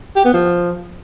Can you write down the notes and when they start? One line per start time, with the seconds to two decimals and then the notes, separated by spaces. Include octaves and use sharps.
0.16 G4
0.25 B3
0.33 F3